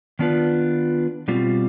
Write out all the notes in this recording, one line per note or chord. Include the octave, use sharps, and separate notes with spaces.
D#3 B3 D4 F4 B4
B2 G3 C4 F4